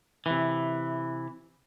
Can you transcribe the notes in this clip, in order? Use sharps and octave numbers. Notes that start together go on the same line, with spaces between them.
C3 E3